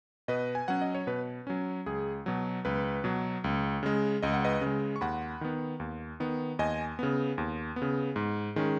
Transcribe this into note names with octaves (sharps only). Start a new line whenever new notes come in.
B2 B4 D#5
G#5
F#3 C#4 F#5
D#5
C#5
B2 B4
F#3 C#4
C#2 G#4
B2 F#3
C#2 B4
B2 F#3
C#2
C#3 G#3
C#2 D#5
F#5
B4 D#5
C#3
G#3
C#6
D#2 F#5 B5
D#3 B3
D#2
D#3 B3
D#2 D#5 G#5
C#3 B3
D#2
B3
C#3
G#2
D#3 G#3 C#4